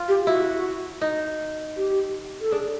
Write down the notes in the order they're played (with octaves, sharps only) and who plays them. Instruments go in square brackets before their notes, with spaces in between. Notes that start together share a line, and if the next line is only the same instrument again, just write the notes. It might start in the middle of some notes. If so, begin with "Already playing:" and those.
Already playing: [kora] F4
[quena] G4
[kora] E4 [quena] F#4
[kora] D#4
[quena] G4
A4
[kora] D4 [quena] G#4